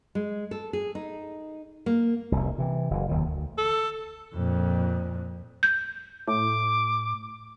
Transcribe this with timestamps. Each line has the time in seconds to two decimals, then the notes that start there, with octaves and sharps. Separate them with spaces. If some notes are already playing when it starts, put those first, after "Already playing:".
0.15 G#3
0.51 A4
0.73 G#4
0.95 D#4
1.86 A#3
2.32 F1 C2
2.58 C3 E3
2.91 F#1 E3
3.09 F1 D#2 D#3
3.26 D2
3.58 A4
4.35 F2 A#2
5.63 G6
6.28 A2 D6